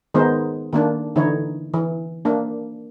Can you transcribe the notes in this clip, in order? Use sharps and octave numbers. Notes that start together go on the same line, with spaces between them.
D#3 G#3 B3 D#4 C5
D#3 A#3 D4
D3 E3 D#4 E4 C#5
E3
A#3 D4